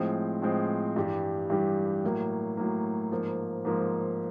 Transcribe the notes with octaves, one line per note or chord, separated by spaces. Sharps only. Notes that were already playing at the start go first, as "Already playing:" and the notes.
Already playing: A2 F3 G#3 C4
A2 F3 G#3 C4
G2 E3 G3
G2 E3 G3
A2 F#3 A#3
A2 F#3 A#3
G#2 F3 A#3
G#2 F3 A#3